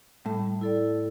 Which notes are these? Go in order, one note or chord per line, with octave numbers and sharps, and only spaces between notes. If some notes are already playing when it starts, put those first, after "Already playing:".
A2 G3
E4 A4 D5